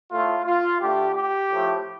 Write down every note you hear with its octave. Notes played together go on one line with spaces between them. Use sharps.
A2 A3 F4
F4
D3 A3 G4
G4
A2 F3 A3